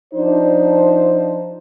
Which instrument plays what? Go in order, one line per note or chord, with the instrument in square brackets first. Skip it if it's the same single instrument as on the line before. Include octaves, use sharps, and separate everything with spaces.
[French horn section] F3 D4 D#4 C5